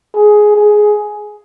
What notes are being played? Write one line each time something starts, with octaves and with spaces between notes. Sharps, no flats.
G#4
G#4